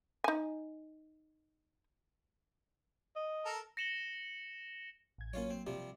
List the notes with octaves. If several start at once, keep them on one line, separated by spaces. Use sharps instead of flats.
D#4 G#5
D#5
A4 A#4
A#6 C#7 E7 F#7 G7
A1 G#6
F#3 A#3 C#4 F4 C#5
C4
C3 F3 G3 G4